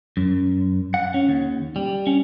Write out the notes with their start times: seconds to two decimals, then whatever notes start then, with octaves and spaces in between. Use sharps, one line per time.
0.17 F#2
0.94 F#5
1.14 C#4
1.29 D#2
1.76 G3
2.07 C#4